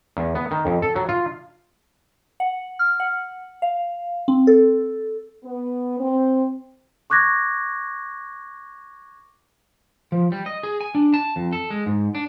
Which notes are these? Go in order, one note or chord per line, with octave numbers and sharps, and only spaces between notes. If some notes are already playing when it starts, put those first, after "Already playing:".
E2
B3
D#3
F2
A4
F#3
F4
F#5
F6
F#5
F5
C4
A4
B3
C4
C#6 D6 F#6 G#6 A#6
F3
G3
D#5
G#4
G#5
D4
A5
F2
A4
G#3
G#2
D4